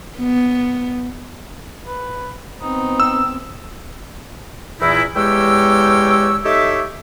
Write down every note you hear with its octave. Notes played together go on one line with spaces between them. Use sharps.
B3
B4
B3 C4 D#4
E6
E2 A#2 E3 D#4 E4
E2 G#3 G4 C#5 G5 E6
D#4 G4 A4 C#5 E5